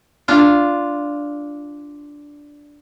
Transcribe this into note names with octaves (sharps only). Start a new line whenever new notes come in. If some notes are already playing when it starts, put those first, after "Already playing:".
D4 F4